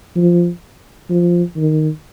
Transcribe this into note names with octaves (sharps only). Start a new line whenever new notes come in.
F3
F3
D#3